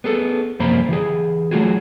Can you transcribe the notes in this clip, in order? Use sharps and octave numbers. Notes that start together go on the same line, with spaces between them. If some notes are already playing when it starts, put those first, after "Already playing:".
B3 G#4 A4
C2 F#2 F3 A#3 C5 B5
E3 G4 G#4
F#3 A3 C4 F4 F#4 G#4